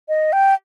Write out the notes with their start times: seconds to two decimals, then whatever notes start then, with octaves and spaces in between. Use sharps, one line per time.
0.09 D#5
0.33 G5